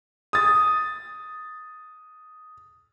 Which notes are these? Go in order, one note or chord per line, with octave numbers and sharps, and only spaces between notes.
D#6 A6